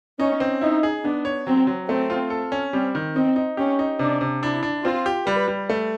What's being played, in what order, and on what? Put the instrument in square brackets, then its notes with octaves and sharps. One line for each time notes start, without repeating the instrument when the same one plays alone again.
[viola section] C#4 [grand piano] D#4
[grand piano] C4
[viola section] D#4 [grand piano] E4
[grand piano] G#4
[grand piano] B3 [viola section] D4
[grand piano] C#5
[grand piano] F#3 [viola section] C4
[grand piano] F#3
[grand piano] A3 [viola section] C4
[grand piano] F4
A4
C#4
[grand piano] G3 [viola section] C4
[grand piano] D#3
[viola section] C4 [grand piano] D#4
[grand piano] D#4
[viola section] C#4 [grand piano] G4
[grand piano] D#4
[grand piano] C3 [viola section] D4
[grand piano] C3
[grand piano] D4 [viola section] E4
[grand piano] D4
[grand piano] C4 [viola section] F4
[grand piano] G4
[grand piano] G3 [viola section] B4
[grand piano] G3
A3